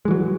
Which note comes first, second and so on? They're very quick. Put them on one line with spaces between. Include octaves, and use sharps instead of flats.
G#3 E3 F#3